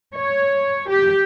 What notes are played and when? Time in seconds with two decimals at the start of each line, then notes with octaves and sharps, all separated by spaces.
0.14 C#5
0.89 G4